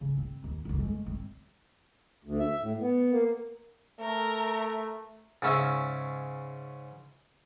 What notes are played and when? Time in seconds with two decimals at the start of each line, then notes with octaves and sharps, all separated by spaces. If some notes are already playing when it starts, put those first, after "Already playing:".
0.01 C#3
0.17 C4
0.44 D#2
0.65 F#1 D2
0.80 G#3 A3
1.06 C4
2.25 D2
2.39 E5
2.61 A2
2.80 B3
3.11 A#3
4.01 A3 A#4
5.42 G#2 C#3 C#4 E5